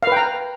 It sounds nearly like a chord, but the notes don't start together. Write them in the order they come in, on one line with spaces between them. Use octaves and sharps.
F5 B4 G5 A#5